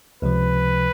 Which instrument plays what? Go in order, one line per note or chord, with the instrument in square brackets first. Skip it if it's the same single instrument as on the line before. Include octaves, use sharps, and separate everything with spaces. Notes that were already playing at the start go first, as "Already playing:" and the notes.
[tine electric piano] C#2 C3 F3 [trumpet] B4